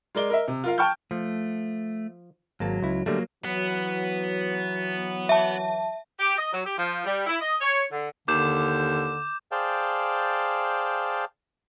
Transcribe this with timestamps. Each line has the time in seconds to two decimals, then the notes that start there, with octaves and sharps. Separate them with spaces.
0.15 G#3 A#4 D5 G7
0.30 A#4 D#5 E5
0.48 C3
0.64 F4 A#4 F5
0.78 G5 A5 C#6 F6 G6
1.11 F3 A3
2.60 G#1 F#3 A#3 A5
2.82 C#2 E4
3.06 D3 F#3 G3 A3 A#3
3.45 E3 F#3 B3
5.29 E5 A5
6.19 G4
6.38 D#5
6.53 F#3
6.65 G4
6.77 F3
7.06 G3
7.27 E4
7.40 D#5
7.61 C#5
7.92 D3
8.28 D#2 D3 D6 G6 E7
9.52 G#4 C5 D5 F5 G5 A5